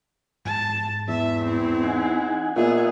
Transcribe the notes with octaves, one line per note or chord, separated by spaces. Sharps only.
G#2 A5
E2 E5
C4 E4
D#4 F#5 G#5
A#2 B3 G#4 D#5 E5 F#5